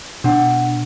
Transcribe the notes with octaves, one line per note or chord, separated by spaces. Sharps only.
B2 D4 F#5